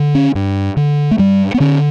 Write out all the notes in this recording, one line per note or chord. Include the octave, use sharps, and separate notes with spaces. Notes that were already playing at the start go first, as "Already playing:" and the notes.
Already playing: D3
C#4
G2
D3
A3
G2 G3
B3
D3 C#4